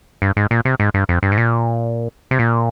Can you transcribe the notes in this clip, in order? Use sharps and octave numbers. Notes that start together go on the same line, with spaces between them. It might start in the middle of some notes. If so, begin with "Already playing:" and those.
G2
G#2
A#2
C3
G#2
G2
F2
G2
G#2
A#2
C3
A#2